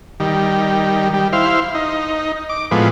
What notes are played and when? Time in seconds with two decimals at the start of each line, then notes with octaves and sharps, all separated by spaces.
0.20 D#3 G3
1.14 G3
1.33 E4 C5 F5
1.75 D#4
2.49 D6
2.71 A2 F3 G#3 B3